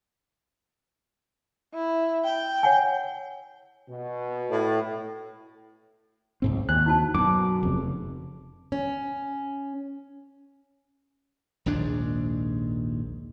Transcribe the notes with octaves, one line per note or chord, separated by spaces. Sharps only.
E4
G5
C#5 F#5 G#5
B2
A2
C#2 G#2 C4
D#2 D4 C5 F#6
D#4 F#4 A5
F#2 B2 D6
F1 F2 C#3
C#4
A#1 D#2 G#2 D4